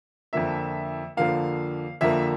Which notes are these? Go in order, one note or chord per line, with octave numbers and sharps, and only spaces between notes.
F2 D3 F3 A#3 E5
F2 D3 F3 A#3 F5
F2 D3 F3 A#3 E5